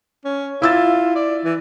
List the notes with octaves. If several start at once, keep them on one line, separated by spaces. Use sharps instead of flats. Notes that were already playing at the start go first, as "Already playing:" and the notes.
C#4
E4 F4 E6 A6
D5
E3